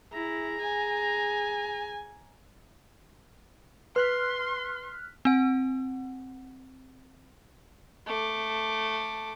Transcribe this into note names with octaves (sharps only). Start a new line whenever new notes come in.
E4 G#4 A#5
G#5
B4 C6 F6 F#6 B6
C4 F#5
A3 D6